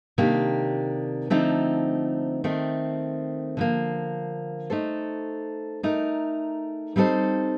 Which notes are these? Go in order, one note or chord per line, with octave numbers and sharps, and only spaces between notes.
C3 D#3 A#3 D4 G4
D3 F3 A3 C4 D#4
D#3 A3 C4
D3 F3 A#3
A3 D#4 A4 C5
A3 D#4 A#4
G3 C4 D#4 A4 C5